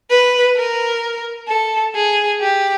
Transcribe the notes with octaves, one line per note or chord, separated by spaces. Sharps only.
B4
A#4
A4
G#4
G4